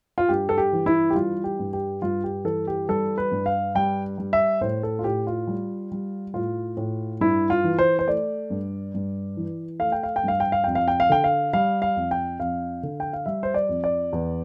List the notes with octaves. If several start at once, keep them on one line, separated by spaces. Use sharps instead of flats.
F4
G2 G4
A4
G4
E3
E4
G4
G3 F4
G4
G2
G4
G2 F4
G4
E3 A4
G4
G3 A4
B4
G2
F5
G3 G5
G3
E5
A2 C5
A4
F4
A2 G4
F4
G3
G3
A2 F4
A2
G2 E4
F4
E3
C5
C5
A3 D5
G2
G2
E3
A3 F5
G5
F5
G5
G2 F5
G5
F5
F2 G5
F5
G5
F5
D3 G5
F5
G3 F5
F5
F2
G5
F2 F5
D3
G5
F5
G3 E5
C5
D5
F2
D5
E2